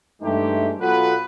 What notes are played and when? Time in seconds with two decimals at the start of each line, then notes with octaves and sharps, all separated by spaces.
0.22 G2 E3 G#3 A3 D#4 G4
0.80 B2 F#3 B3 F4 A4 B4